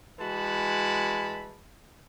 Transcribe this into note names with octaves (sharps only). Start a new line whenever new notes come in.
E3 G#3 F#4 A5 B5